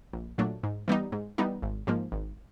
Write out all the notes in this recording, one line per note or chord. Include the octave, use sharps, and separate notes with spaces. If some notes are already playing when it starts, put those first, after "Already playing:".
A#1
A#2 F#3 A3 D4
G#2
E3 G3 B3 D#4
G#2
E3 G3 B3 D#4
G#1
G#2 F3 A#3
G#1